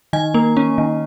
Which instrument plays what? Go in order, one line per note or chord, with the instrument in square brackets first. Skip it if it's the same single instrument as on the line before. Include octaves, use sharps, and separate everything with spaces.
[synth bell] D#3 G#5
A#3
C#4
D#3